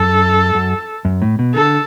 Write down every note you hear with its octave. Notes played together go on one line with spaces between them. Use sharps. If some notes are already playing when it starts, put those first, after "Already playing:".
Already playing: F#2 A4
F#2
F#2
A2
B2
D3 A4